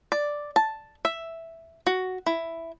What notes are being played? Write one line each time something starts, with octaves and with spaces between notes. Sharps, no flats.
D5
A5
E5
F#4
E4